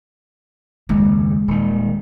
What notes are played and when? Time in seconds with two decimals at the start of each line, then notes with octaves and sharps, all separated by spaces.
0.89 F#1 D#2 G#3
1.48 D#1 D#3